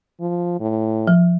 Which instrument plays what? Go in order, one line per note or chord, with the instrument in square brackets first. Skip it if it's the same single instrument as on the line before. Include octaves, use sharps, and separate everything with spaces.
[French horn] F3
A2
[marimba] F3